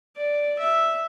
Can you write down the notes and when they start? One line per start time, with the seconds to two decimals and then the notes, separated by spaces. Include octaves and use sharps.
0.17 D5
0.59 E5